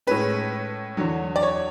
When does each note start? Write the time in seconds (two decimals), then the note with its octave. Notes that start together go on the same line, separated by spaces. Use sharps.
0.07 A2 G#3 C#4 B4
0.97 E2 D3 F#3
1.36 D5
1.42 C#5